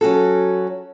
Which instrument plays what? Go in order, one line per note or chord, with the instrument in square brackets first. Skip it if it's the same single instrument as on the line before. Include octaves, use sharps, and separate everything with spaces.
[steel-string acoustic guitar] F#3 C#4 F#4 A4